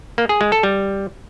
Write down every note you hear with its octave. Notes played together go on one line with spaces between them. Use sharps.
A#3
G#4
G#3
A4
G3